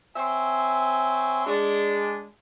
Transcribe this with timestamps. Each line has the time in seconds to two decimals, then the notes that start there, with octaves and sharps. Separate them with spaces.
0.16 C4 C#5 E5 G#5 C6
1.45 G#3 D4